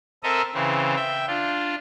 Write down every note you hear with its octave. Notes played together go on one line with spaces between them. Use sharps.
C4 A4 A#4 D#5 E5 A#5
C#3 E3 C4
E5 G5
D4 F4